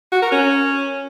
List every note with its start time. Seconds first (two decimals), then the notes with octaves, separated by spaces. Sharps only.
0.12 F#4
0.22 A#4
0.32 C#4